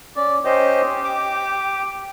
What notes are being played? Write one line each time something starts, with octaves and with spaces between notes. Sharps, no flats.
C#4 D5
C#4 G4 C5 D#5
D6